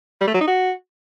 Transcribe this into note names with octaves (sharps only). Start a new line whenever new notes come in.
G3
A3
F#3
D#4
F#4